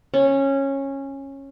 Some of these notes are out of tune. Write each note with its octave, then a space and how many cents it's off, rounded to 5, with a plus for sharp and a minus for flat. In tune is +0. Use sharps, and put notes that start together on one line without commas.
C#4 -15